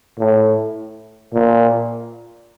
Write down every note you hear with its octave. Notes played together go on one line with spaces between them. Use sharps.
A2
A#2